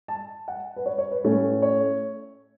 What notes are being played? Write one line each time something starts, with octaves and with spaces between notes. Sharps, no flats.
A5
F#5
B4
C#5
C#5
B4
A2 A3 C#4
C#5